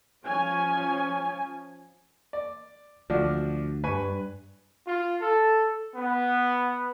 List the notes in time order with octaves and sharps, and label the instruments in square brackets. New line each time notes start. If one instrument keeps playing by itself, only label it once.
[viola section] F3 C#4 G#5
[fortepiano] D5
[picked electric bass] D2 [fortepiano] F3 D4 F#4
[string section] G2 [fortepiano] B4 G#5 C#6
[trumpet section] F4
A4
B3